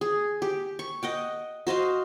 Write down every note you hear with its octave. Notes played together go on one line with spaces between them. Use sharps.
G#4
G4
C#6
D#5 F#5 G5
F#4 C5 D#5 F5